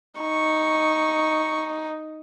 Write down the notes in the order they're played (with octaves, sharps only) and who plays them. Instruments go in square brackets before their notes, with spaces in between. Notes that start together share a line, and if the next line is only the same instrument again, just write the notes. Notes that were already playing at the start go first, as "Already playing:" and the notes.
[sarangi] D#4 [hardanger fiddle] C#6